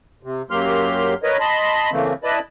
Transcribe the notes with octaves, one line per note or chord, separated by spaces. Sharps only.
C3
F#2 F#3 A#3 G4 C6 F6
A#4 B4 C#5 D#5
D#5 A5 B5 C6
C#3 E3 A3 A#3 C4
E4 B4 D5 D#5 A5 B5